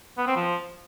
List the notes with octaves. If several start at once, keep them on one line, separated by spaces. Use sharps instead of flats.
B3
C4
F3